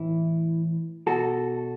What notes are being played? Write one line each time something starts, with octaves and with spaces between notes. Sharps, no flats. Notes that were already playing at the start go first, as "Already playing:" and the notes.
Already playing: A2 E3 E4
B2 F#4 A4